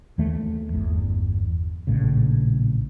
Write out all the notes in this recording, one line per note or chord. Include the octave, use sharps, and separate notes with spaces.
D#2 E3 A3
G1 E2
A#1 A2 C#3